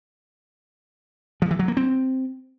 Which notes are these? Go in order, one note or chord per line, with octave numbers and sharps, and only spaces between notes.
F3
E3
F#3
A#3
C4